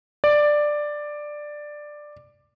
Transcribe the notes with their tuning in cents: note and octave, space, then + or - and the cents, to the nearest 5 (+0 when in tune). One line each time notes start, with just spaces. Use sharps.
D5 +10